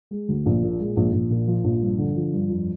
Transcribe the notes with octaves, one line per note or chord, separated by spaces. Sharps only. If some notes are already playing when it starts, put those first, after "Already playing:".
G#3
D2
A#1
A#2
G#3
A#1
A#1
A#2
F3
A#1
G2
D3
F3
G2
F2